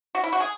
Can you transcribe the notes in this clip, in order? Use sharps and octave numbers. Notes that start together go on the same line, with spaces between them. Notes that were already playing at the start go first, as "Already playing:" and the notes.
F#4
E4
F#4
G#4